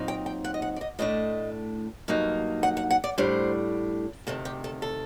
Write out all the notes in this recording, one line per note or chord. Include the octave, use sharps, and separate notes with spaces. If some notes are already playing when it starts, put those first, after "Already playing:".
Already playing: A#2 F#3 C4 D#4
G5
G5
F#5
D#5
F#5
D5
D#5
A2 A3 D4 D#5
G2 F#3 A#3 D#4
F#5
F#5
F#5
D5
A2 G3 D4 C5
D2 C3 D#3 A4
G4
A4
A4